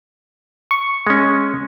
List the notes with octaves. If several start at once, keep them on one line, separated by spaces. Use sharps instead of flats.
C#6
G#3 C#4